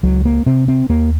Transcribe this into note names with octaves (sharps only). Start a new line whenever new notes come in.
C#2 F#3
A#3
C3 C4
C4
D#2 A#3